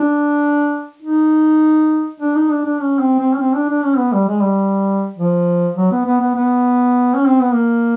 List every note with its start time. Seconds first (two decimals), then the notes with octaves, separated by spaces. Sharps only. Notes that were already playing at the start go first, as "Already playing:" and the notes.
Already playing: D4
1.02 D#4
2.20 D4
2.35 D#4
2.50 D4
2.65 D4
2.80 C#4
2.99 C4
3.19 C4
3.34 C#4
3.39 C4
3.54 D4
3.69 D4
3.84 C#4
3.98 B3
4.13 G3
4.28 G#3
4.42 G3
5.17 F3
5.76 F#3
5.91 B3
6.05 B3
6.20 B3
6.35 B3
7.14 C#4
7.27 C4
7.41 B3
7.53 A#3